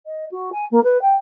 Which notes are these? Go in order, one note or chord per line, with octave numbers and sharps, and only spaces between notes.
D#5
F#4
G#5
A#3
B4
G5